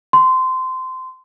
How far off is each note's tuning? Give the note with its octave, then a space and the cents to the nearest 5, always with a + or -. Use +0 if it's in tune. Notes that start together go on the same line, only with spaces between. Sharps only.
C6 -20